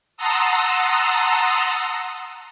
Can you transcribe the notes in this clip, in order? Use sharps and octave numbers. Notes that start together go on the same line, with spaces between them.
F#5 A5 A#5 C6 D#6 E6